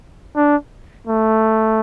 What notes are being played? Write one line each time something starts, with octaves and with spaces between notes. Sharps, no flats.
D4
A3